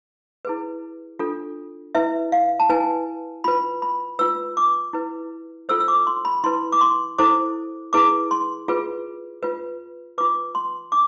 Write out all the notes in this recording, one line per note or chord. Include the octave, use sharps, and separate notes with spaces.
E4 G#4 B4
D4 F4 A4
E4 B4 E5
F5
A5
E4 B4 G#5
F4 B4 B5
B5
F4 B4 E6
D6
E4 B4
F4 A4 C5 E6
E6
D6
C6
B5
E4 B4 C6
D6
C6
E4 A4 C5 D6
E4 G#4 B4 D6
C6
F4 G#4 B4
F4 B4
F4 B4 D6
C6
D6